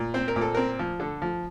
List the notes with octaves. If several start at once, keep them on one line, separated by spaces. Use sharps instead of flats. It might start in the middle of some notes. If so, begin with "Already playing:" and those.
Already playing: A#2
C4 C5
A#4
A#2
A4
C4 A#4
F3
D3 A4
F3